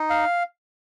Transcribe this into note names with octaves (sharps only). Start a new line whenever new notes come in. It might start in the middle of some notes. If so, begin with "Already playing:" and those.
Already playing: D#4
F5